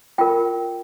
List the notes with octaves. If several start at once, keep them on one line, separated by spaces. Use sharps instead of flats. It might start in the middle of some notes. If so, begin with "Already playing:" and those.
F4 A#4 G5